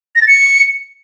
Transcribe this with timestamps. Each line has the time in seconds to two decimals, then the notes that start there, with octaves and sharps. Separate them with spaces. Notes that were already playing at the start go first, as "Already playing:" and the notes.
0.16 A#6
0.22 A6
0.28 C#7